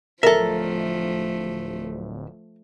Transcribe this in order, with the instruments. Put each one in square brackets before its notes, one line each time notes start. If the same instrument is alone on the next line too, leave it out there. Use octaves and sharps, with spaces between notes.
[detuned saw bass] D1 [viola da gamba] F3 A3 [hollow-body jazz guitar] A4 E5 [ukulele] A#4